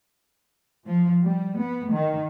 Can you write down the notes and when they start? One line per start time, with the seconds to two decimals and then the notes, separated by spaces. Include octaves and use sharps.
0.86 F3
1.23 G3
1.59 B3
1.94 D#3